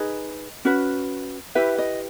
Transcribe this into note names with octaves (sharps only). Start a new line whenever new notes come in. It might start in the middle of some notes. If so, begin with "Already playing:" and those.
Already playing: D#4 G#4 B4 D#5
C#4 F#4 B4
E4 G4 B4 E5
D#5